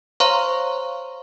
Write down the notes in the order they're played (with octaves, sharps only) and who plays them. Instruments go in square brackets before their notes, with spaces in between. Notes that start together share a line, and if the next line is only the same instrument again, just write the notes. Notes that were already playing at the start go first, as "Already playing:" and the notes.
[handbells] C5 C#5 F5 A#5 C6 C#6